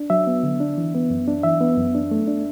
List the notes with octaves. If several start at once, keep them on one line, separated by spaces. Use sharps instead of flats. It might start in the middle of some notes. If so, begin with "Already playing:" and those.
Already playing: D4
F#3 E5
B3
D3
D4
E3
B3
F#2
D4
E3 E5
B3
F#2
D4
A3
D4